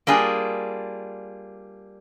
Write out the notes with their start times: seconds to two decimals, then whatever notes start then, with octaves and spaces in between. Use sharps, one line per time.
0.07 G3 A#3 D4 F4 G#4